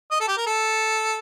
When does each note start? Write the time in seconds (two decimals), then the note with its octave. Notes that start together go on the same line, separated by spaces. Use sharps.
0.11 D#5
0.20 A4
0.28 G4
0.37 A#4
0.46 A4